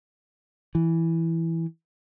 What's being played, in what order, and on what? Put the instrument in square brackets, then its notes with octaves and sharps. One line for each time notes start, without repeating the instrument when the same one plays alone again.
[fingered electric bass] E3